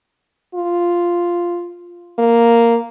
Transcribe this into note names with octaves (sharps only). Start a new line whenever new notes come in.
F4
A#3